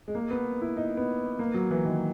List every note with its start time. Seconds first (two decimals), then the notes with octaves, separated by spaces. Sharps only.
0.08 G#3
0.15 A#3
0.31 B3
0.62 E4
0.77 D#4
0.97 B3
1.39 A#3
1.54 F#3
1.71 E3
1.85 D#3